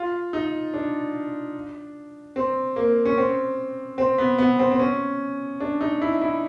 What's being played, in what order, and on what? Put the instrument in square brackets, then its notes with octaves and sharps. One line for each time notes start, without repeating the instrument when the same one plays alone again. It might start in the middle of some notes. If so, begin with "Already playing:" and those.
Already playing: [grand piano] F4
D#4
D4
C4
A#3
C#4
C4
C4
B3
B3
C4
C4
C#4
D4
D#4
E4
E4